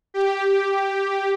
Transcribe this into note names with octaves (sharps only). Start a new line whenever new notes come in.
G4